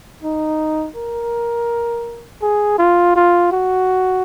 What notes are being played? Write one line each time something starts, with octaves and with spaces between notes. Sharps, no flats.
D#4
A#4
G#4
F4
F4
F#4